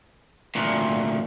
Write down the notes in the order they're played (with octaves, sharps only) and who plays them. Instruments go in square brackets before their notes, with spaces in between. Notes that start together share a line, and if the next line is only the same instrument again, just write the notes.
[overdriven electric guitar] D2 A#2